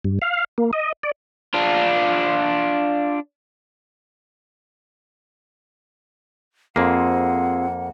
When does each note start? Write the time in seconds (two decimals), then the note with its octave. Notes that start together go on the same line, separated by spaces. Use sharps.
0.05 G2
0.22 F5
0.58 A#3
0.73 D#5
1.03 D5
1.54 D4 F4
6.76 F2 A#3 C4 F4 G#4 F#5